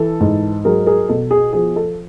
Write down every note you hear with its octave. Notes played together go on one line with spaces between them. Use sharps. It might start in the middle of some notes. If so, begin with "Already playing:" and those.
Already playing: E3 A4
G#2
F#3 G#4 A#4
G#4 A#4
B2 A4
G#4
F3 G#4
A4